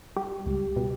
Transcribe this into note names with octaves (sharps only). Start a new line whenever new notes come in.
G3 G4
C#2
B2